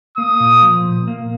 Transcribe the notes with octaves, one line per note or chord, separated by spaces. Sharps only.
A#3 D#6
A#2
F3
A#2
A#3